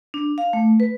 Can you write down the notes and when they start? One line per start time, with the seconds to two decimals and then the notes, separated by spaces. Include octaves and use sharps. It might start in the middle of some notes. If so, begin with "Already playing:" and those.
0.14 D4
0.38 F5
0.53 A3
0.80 B4